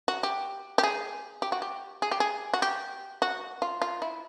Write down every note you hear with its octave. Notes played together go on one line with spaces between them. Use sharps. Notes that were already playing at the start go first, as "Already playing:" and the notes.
F#4
G4
G4
G#4
G4
F#4
G4
G#4
G4
G#4
F#4
G4
F#4
F4
F4
E4